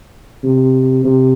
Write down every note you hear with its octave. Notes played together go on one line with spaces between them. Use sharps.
C3
C3